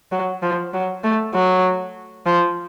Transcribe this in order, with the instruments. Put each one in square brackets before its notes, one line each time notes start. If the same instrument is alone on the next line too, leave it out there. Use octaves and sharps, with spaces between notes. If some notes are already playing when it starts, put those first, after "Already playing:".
[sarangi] F#3
F3
F#3
A3
F#3
F3